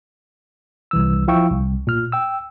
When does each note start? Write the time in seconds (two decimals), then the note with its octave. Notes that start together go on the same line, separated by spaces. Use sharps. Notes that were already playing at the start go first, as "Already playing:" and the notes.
0.91 C2 E3 E6
1.28 F3 E4 F5 G5 C#6 E6
1.50 C2
1.87 A#2 F6
2.12 G5 E6